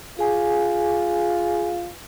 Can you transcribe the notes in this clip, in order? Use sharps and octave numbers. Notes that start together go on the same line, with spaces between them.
F4 G#4 G#5